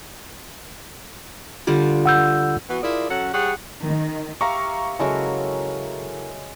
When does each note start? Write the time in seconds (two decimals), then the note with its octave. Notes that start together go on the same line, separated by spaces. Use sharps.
1.67 D3 G3 F4
2.06 F#5 E6 G6
2.69 E3 B3 F#4
2.82 E4 F4 G#4 A#4 D5
3.10 F#3 C#4 A4 F#5
3.33 G3 G#4 C#5 F#5
3.83 D#3
4.41 G4 A#4 E5 F5 A#5 C#6
4.99 C#3 F#3 G#3 E4 F#4 A4 A#4